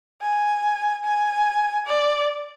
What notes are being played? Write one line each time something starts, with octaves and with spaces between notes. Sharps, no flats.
G#5
G#5
D5